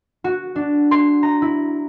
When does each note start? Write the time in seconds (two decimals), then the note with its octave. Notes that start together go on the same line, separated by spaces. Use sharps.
0.24 F#4
0.56 D4
0.91 C6
1.23 A#5
1.42 E4